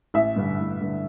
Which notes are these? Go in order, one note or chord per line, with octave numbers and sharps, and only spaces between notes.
A1 E5
G2 D3
A1
G2 D3